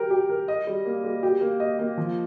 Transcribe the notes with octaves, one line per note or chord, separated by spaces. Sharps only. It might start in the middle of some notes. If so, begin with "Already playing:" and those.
Already playing: G4 A#4
G4
A#4
D#5
G3
A#3
G3
G4
A#3
D#5
A#3
F3